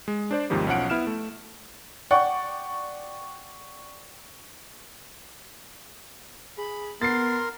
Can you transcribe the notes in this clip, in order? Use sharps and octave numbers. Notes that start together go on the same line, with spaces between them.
G#3
D4 C5 D5
D#2 G#2 C3 D#3 F3 G3
B1 F3 C#4 F#5 D7
B3 E4 F6 E7
A3
D5 F#5 G5 C#6
G#4 B5
B3 A#4 C6 A6 C7